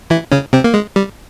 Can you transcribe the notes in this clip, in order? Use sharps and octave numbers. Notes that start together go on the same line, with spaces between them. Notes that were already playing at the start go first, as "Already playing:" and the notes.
E3 E4
C#3 C#4
C3 C4
A#3
G#3
G3